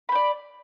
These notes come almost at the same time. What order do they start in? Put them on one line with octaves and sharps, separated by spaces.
B5 C5 D5